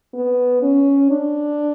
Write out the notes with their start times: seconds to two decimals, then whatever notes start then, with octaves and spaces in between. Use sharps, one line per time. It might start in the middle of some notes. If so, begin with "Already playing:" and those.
0.14 B3
0.62 C#4
1.11 D4